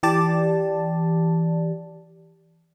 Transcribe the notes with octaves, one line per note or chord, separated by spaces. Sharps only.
E3 G4 D5 A5